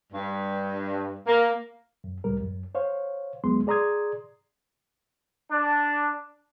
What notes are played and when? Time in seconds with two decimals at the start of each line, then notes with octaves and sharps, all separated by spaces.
0.13 G2
1.26 A#3
2.04 F#2
2.24 C#2 A2 G3 A#4
2.41 F#2
2.75 C5 C#5 F5
3.44 D#2 F#3 G#3 B3 C6
3.67 G#4 D5 A#5 C6 D#6 G#6
5.51 D4